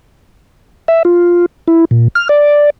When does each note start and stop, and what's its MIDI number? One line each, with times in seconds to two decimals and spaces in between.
0.88 1.03 76
1.05 1.46 65
1.68 1.85 64
1.91 2.08 46
2.15 2.28 89
2.29 2.70 74